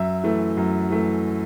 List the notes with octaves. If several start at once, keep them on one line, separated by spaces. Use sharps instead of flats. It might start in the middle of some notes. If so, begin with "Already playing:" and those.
Already playing: F#2 E5
E3 A3
F#2
E3 A3